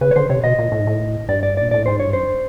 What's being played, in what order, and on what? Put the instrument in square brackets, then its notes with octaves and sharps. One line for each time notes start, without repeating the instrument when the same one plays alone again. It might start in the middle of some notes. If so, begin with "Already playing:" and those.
[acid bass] C#3 [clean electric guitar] B4
[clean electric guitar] C#5
[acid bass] D3 [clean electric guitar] C5
[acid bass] C3 [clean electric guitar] C#5
[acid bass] B2 [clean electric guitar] D#5
[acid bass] A#2
A2
G#2
A2
[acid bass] G2 [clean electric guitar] D5
[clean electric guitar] D5
[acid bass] A#2 [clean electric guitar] D5
[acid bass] A2 [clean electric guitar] D5
[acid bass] G#2 [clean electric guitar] C5
[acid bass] G2 [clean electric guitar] C#5
[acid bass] F#2 [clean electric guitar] C5